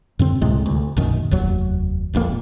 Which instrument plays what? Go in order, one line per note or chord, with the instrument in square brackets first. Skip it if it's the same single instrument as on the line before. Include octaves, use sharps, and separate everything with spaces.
[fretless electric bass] F#2 D3 C4
C#2 A2 C3 G#3
D2
A#1 F#2 D#3
F1 D#2 F#3
D1 A#1 F2 A#3